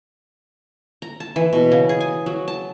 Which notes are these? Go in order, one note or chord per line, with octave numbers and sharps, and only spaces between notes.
A#5
A5
E3
B2
C#3
G#4
G#5
F#3
A5